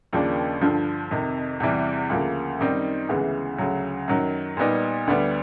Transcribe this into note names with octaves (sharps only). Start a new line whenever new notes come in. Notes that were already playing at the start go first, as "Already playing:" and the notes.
D#2 C#3 F3 A#3 D4
G2 D3 F3
F2 C3 D#3
E2 C3 E3 G3
D2 C#3 F3 A#3
F#2 D#3 G3 C4 D#4
D2 C#3 E3 G#3 B3
D2 C#3 F#3
F#2 D#3 F#3
A#2 G3 B3 D#4
D2 D3 G3 B3